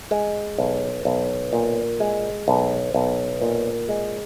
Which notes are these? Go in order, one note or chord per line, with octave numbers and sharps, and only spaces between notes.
G#3
B1
B1
A#2
G#3
B1
B1
A#2
G#3